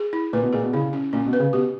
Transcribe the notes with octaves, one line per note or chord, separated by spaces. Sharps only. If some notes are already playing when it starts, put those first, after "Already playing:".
Already playing: G#4
E4
A#2 B4
B2
A#2 G#4
B2
C#3 E4
C#4
A#2 C#4
B2
B4
C#3
B2 G4